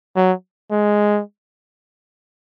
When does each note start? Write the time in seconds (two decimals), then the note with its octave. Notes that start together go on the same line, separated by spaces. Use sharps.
0.16 F#3
0.71 G#3